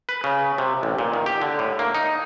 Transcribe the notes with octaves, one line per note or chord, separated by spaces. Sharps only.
B4
C#3
C3
A1
A#2
D#3
G4
D3
A2
A#3
D#4